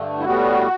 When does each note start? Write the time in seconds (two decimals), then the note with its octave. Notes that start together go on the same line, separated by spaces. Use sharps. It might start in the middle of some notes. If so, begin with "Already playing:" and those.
Already playing: G2 D3 A3
0.19 E4
0.25 A2 G3 B3 F#4